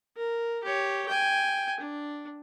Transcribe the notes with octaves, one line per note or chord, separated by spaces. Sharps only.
A#4
G4 C#5
G5 G#5
D4